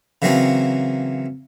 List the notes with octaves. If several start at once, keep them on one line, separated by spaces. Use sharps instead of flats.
C#3 E3 F#3 A#3 C4 C#4